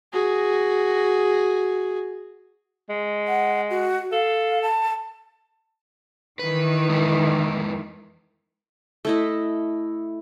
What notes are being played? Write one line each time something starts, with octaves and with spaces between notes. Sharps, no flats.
F#4 G#4
G#3
F#5
F#4
A4 F5
A5
D#3 E3 B4
F2 G#3 B4
A3 E4 D#5